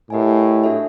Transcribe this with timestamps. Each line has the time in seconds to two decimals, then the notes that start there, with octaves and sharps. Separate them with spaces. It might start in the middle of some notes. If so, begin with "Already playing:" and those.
0.10 A2 G4 A#4 D#5 G#5
0.64 D4 F#4 A4 C#5 E5